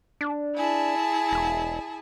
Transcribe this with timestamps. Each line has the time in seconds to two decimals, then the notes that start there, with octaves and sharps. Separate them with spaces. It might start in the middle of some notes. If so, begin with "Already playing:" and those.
0.21 D4
0.56 E4 G#4 A5
1.31 E1